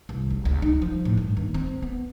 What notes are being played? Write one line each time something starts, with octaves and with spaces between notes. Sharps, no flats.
C2
F#1
C#2
D#4
F3
A2
G2
D#2
C4
B3